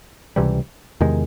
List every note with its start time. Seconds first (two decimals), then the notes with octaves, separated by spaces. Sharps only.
0.36 C#2 C3 E3 G3
1.01 E2 C3 D#3 G#3